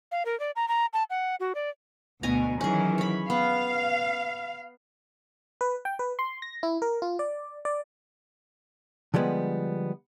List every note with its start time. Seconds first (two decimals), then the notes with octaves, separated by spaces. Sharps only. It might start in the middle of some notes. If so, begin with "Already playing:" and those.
0.12 F5
0.25 A#4
0.40 D5
0.56 A#5
0.68 A#5
0.93 A5
1.10 F#5
1.40 F#4
1.55 D5
2.23 D2 B2 G#5 A#5
2.61 D#3 E3 F#3 C#4 G#4
2.98 C#5 B5
3.30 B3 F5
5.61 B4
5.85 G5
5.99 B4
6.19 C6
6.42 A#6
6.63 E4
6.82 A#4
7.02 F4
7.19 D5
7.65 D5
9.14 D3 F3 G3 G#3 B3